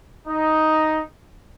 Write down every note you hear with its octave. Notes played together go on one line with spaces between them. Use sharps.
D#4